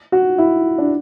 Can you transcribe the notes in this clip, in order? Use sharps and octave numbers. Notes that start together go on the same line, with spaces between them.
F#4
E4
D4